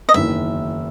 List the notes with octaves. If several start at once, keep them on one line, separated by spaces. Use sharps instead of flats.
D#5
F#1 E2 D#3 E5